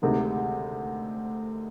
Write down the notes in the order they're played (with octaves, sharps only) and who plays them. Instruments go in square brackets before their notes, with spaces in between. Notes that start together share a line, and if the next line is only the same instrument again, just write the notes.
[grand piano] D2 C3 D#3 G#3